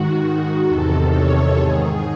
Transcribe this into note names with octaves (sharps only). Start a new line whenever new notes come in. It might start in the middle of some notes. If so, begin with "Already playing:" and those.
Already playing: G#2 D#3 F#4
E2 C3 D#3 A4
C#5
G#2 D#3 G#4